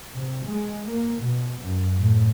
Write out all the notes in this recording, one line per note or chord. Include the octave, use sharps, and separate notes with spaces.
C3
G#3
A#3
B2
F#2
A2